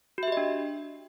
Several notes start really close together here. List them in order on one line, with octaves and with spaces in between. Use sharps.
F#4 E5 G4 D#5 D4